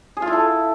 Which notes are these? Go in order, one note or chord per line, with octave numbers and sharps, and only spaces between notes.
G#4
F4
E4
A4